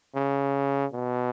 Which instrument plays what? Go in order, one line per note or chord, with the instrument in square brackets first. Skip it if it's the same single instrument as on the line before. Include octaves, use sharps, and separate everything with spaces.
[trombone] C#3
B2